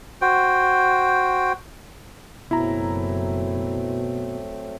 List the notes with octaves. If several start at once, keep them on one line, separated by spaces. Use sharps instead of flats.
F#4 C5 G5
F#1 B2 F#3 A3 C4 E4 A#5